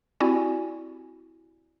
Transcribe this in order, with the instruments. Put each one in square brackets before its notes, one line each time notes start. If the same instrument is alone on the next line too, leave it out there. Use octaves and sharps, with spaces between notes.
[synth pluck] C4 E4 F#4 G4 D5 G#5